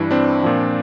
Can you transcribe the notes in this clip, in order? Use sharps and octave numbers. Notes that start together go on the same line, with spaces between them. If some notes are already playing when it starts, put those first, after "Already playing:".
Already playing: G2 E3 D4 E4
C4 D4
A#2 F3